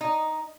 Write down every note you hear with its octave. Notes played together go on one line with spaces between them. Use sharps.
D#4